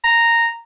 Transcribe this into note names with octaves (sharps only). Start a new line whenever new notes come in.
A#5